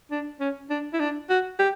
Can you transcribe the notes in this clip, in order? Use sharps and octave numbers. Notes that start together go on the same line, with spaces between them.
D4
C#4
D4
E4
D4
F#4
G4